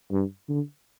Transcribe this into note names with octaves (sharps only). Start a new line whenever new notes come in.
G2
D3